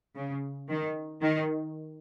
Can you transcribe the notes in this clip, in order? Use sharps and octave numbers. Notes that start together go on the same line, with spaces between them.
C#3
D#3
D#3